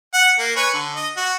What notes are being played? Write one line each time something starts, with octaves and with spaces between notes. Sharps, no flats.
F#5
A#3
B4 C#5 G#5
D3
D#5
F#4